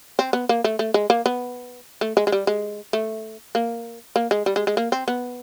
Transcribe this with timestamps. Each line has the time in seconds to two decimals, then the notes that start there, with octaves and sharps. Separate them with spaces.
0.19 C4
0.33 B3
0.49 A#3
0.64 A3
0.79 A3
0.94 G#3
1.10 A#3
1.26 B3
2.01 A3
2.17 G#3
2.27 G#3
2.32 G3
2.47 G#3
2.93 A3
3.55 A#3
4.16 A#3
4.31 G#3
4.46 G3
4.56 G#3
4.67 G#3
4.77 A#3
4.92 C4
5.08 B3